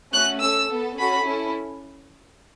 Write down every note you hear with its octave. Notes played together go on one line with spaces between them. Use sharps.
A3 C#4 F#4 F#6
C#4 A4 E6
B3 A4
C#4 F#4 A4 B5
C#4 E4 A4